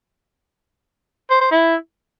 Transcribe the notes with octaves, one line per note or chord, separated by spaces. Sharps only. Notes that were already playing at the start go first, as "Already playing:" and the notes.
C5
C5
E4